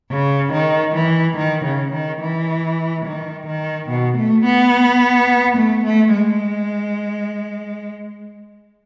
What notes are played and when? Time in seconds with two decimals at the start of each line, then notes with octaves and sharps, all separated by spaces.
0.10 C#3
0.53 D#3
0.95 E3
1.37 D#3
1.65 C#3
1.93 D#3
2.21 E3
3.05 D#3
3.47 D#3
3.90 B2
4.17 A3
4.45 B3
5.57 A3
5.85 A3
6.13 G#3